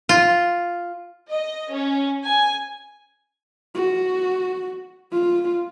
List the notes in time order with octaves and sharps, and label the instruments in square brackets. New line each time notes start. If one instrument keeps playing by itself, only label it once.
[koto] F4
[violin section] D#5
C#4
G#5
[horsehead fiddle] F#4
F4